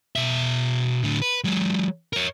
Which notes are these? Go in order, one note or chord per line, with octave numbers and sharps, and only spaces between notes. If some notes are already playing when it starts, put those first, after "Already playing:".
B2 E5
A2 D3
B4
F#3 G#3
A#4 C#5